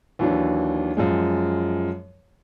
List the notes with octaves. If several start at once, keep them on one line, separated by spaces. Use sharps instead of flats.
D#2 E3 F#3 D4
F#2 F3 G#3